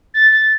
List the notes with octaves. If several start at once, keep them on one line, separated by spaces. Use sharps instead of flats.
A6
A6